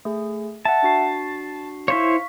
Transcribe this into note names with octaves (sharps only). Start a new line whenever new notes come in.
A3 G#4
E5 F#5 A5
D4 F#4 C7
E4 C5 C#5 F5 C#6 B6